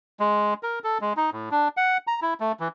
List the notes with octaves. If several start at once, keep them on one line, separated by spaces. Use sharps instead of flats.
G#3
A#4
A4
G#3
D#4
A2
D4
F#5
A#5
E4
A3
E3